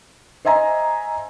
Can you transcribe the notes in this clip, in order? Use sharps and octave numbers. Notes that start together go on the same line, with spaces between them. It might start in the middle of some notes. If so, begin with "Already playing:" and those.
C5 D#5 E5 G#5 A#5